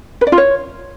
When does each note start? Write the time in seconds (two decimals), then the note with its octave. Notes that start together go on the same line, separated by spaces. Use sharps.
0.21 B4
0.27 D5
0.32 F4
0.38 C#5